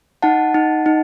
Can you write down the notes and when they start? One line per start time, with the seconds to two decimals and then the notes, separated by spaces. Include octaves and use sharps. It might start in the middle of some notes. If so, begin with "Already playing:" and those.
0.22 D#4 F#5 A5
0.54 D#4
0.86 D#4